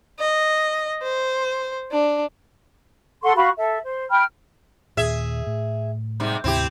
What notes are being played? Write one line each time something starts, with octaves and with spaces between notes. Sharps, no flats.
D#5
C5
D4
A4 F#5 C6 C#6
F#4 F5 B5 C#6
A4 E5
C5
G5 B5 F6
D#2 A#2 G#4 E5
A2
G#2 C3 G3
D2 G#2 C3 C4 E4 G4